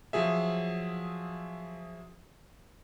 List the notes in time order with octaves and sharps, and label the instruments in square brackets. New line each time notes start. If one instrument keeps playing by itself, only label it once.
[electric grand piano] F3 F#3 G#4 E5